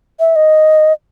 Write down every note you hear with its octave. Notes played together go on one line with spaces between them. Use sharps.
E5
D#5